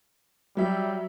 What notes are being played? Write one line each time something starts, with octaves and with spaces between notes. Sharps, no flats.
F#3 G3 E5